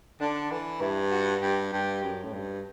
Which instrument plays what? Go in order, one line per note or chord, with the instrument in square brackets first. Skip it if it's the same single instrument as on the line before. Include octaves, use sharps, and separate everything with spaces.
[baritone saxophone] D3 [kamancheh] D4
[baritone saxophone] E3
[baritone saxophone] G2 [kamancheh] E4
[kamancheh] F#4
[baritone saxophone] G2 [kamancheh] G4
[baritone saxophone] G2 [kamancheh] G4
[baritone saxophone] F#2
A2
G2